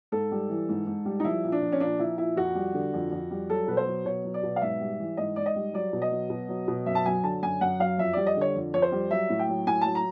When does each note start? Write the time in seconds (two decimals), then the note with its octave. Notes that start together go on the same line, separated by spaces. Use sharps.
0.12 G#2 A4
0.32 G3
0.50 E3
0.69 G#2
0.87 G#2
1.06 G3
1.20 D#4
1.24 F3 E4
1.44 A#2
1.52 D4
1.62 F3
1.72 C#4
1.80 A#2 D4
1.99 F3 E4
2.18 A#2 E4
2.37 F2 F#4
2.55 G3
2.74 D3
2.94 F2
3.12 F2
3.31 G3
3.49 F#3 A4
3.68 B2 B4
3.77 C5
3.87 F#3
4.05 B2 C#5
4.25 F#3
4.34 D5
4.43 B2
4.56 F5
4.62 G#2 E5
4.81 G3
5.00 E3
5.17 G#2 D#5
5.36 G#2 D5
5.46 D#5
5.56 G3
5.73 F#3 D5
5.93 B2
6.02 D#5
6.11 F#3
6.30 B2
6.49 F#3
6.68 B2
6.86 F#2 E5
6.95 A5
7.06 F#3 G#5
7.24 D3 A5
7.43 F#2 G#5
7.61 F#2 F#5
7.80 F#3 F5
7.98 F2 E5
8.13 G3 D5
8.26 D#5
8.37 D3 C#5
8.55 F2
8.74 F2 C#5
8.82 C5
8.92 G3
9.11 F#3 E5
9.30 A2
9.39 G5
9.49 F#3
9.67 A2 G#5
9.81 F#3 A5
9.95 A#5